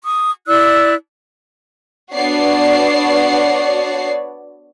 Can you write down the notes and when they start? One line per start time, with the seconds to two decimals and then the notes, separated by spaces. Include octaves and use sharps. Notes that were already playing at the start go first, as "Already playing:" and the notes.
0.04 C#6 D#6
0.47 E4 D5 E6 F#6
2.14 B3 D4 F#4 C#5 D5 C7